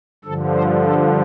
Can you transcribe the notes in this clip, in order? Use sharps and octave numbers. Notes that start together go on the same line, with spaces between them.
G2 D3 F3 A4
C5
A4